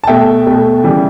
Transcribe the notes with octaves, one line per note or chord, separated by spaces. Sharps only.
A5
B2 A3 E5 G5
B2 A3
C#3 E3 G3